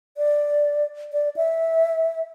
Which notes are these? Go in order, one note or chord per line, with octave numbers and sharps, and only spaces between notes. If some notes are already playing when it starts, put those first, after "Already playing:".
D5
D5
E5